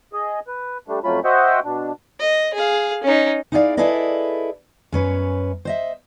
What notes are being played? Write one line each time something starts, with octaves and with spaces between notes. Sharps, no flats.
G#4 D#5
B4
G3 A3 D4
F2 F#3 A3 C#4 F4 B5
F#4 C5 D#5 E5 F#5 G5
B2 D4
D#5
G#4 F5
C#4 D#4
D#4 E4 G#4 A4 D5 F5
E4 G#4 A4 B4 D5 D#5
F#2 C#4 B4 C#5
C5 D#5 E5